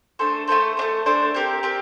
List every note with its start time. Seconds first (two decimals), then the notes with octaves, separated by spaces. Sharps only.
0.19 A3 D4 A4 C5
0.48 A3 D4 A4 C5
0.77 A3 D4 A4 C5
1.06 A3 D4 A4 C5
1.34 C4 G4 A#4
1.63 C4 G4 A#4